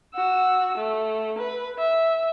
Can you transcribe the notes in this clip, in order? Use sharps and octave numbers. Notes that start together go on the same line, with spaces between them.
F#4 E6
A3
B4
E5